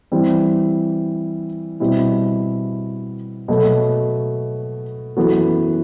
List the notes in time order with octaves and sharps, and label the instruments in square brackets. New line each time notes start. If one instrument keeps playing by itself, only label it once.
[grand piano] E3 G3 C4
B2 G3 C4 E4
B2 F#3 A3
F#2 E3 B3 F#4 A4